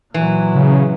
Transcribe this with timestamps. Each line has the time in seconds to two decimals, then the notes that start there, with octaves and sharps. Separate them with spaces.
0.14 A#2 E3 F#3
0.55 C#3